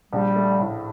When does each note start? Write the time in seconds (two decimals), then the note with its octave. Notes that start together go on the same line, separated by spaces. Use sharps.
0.12 A#1 G3
0.36 A3
0.60 A2